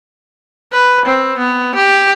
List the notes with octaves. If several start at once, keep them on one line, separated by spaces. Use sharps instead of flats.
B4
C4
B3
G4